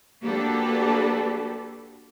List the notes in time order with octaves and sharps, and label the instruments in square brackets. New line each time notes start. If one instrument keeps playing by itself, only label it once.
[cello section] A#3 D4 F#4 G4 A4 B4